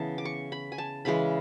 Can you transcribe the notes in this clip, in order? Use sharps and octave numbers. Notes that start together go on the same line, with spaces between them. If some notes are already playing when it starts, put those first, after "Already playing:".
Already playing: C#3 E3 B3 A5
D6
C#6
B5
G#5
A5
C#3 E3 G#3 B5